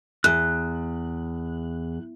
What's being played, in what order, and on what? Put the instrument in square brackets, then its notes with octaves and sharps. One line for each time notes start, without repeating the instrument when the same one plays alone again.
[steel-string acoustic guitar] E2 [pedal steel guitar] F#6